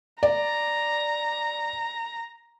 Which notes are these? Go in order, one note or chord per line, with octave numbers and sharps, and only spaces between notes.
D5 A#5